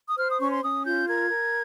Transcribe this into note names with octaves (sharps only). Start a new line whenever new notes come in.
D#6
C5 F6
D#6
C#4 C#6
C6
C#4 D#6
F4 G6
A#4 G#6
A#4